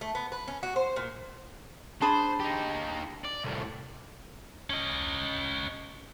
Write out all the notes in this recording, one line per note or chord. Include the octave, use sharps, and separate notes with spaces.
A3
B3
B4
C#4
F#4
C5
A#2
D4 G#4 C5 A5 B5
D#4 G4
D5
C2 A2
C#4 D#5